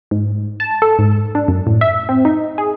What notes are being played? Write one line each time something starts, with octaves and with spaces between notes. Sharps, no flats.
G#2
A5
A4
G#2
D4
F#2
A2
E5
C4
D#4
G#4